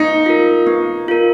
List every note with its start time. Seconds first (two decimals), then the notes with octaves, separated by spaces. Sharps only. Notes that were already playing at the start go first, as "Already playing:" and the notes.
Already playing: B3 D#4
0.26 F4 A#4
0.67 B3
1.08 F4 A#4